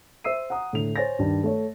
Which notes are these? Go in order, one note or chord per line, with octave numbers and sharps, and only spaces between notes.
C5 E5 E6 C7 D#7
F#5 A#5 D#6
A2 D3 F7
C5 C#5 G#5 A6 A#6
G2 D#3
A3 C#5